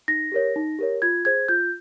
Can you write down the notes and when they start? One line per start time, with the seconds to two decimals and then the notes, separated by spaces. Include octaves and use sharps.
0.08 D#4 A#6
0.32 G4 A#4 C#5
0.56 D#4
0.79 G4 A#4 C#5
1.02 F4 G#6
1.25 G#4 C5 G#6
1.48 F4 G6